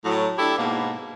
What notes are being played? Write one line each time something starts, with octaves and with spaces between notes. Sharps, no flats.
A2 F#3
D4 E4 G4 A4
G#2 B2 A#3